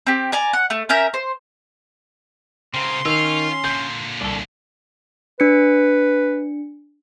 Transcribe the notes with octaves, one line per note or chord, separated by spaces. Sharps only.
C4 G4
D5 G#5 A#5
F#5
A3
C#4 A#4 E5 G6
C5
C#3 C4 A#4 C6
D#3 C#4 F4 E6
A#2 D3 G6
C2 D4 A4
D4 B4 C#7